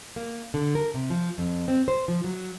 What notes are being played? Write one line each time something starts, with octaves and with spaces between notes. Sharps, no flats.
A#3
D3
A#4
C3
F3
F2
C4
C5
F3
F#3